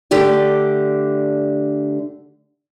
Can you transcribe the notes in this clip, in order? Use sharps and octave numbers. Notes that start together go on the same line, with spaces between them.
D3 A3 G4 D5